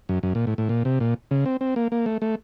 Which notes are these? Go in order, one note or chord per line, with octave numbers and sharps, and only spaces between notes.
F#2
F#2
A#2
A2
A2
A#2
C3
A#2
C#3
C4
C4
A#3
A#3
A3
A3